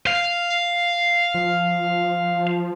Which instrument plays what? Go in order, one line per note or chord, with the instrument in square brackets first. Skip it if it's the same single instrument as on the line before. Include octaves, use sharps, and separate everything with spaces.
[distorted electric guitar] F5
[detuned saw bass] F3